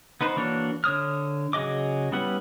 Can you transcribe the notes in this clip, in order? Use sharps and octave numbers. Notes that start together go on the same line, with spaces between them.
B3 D#4 B4 C5
E3 A#3 D4 F#4 C#5
D3 C#5 D#6 F6
C#3 F#3 G#4 D#5 D6
G3 B3 C#4 E4 F#5